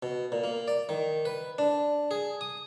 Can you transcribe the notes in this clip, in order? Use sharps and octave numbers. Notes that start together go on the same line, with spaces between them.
B2
A#2
A#3
D5
D#3
B4
D4
G#4
D#6